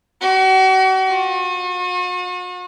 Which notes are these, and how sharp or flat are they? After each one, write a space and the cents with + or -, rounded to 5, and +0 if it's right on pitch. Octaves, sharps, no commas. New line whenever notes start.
F#4 +40
F#4 -45